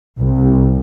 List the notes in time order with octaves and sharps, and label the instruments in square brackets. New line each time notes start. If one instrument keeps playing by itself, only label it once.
[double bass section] C2